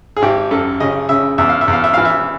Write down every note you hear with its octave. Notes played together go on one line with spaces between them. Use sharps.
G#4
G#1 G4
F#2 A4
C#3 D#5
C#3 E5
E2 E5
F5
E5
E2 F5
E5
E3 F5
E5